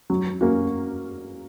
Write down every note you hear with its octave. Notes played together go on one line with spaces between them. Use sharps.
F#3
A#3 C#4 F#4